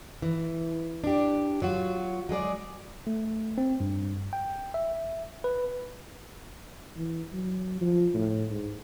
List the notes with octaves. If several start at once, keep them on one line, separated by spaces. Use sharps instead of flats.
E3
D4 G4
F#3 F4 F#4
F#3 G#3 G#4 D5
A3
C4
G2
G5
E5
B4
E3
F#3
F3
A2
G#2